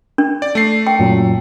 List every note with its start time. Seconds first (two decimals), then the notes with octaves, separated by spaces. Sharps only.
0.18 D4
0.42 D5
0.55 A3 C7
0.87 G5
0.99 F#2 A#2 F#3